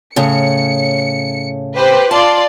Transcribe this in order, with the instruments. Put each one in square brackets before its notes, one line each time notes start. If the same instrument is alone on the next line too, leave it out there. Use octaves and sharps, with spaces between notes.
[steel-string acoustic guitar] A2 C#3 [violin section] C#7
[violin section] G4 B4 C5
[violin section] F4 D5 C6 [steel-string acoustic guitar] A5